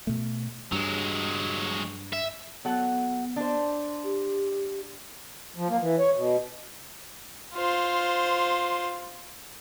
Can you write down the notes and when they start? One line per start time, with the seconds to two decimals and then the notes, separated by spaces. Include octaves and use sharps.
0.07 B2 A3
0.72 G2 F#3 G#3
2.13 E5
2.65 F#3 B3 A4 F#5
3.36 D4 C5
4.04 G4
5.56 F3
5.69 A#3
5.81 E3
5.99 C#5
6.15 B2
7.56 F4 C5